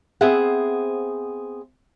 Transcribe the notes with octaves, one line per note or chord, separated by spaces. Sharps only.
B3 C4 G#4 C5 E5 F#5